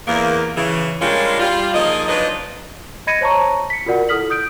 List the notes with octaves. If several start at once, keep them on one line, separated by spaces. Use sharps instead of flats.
E2 A#3
C#3 E3
G3 G#3 A#3 C#4 D4 F4
G3 F4
F3 A#3 D#4 G#4 D#5
F3 F#3 D4 D#4 B4 D#5
D#5 B5 G#6 A#6 C#7 D#7
C5 C#5 A5 A#5 C#6
B6 C#7
F4 F#4 A#4 D5 F#5
E4 A4 D#6 F6 B6 F#7
D#6 G6 D7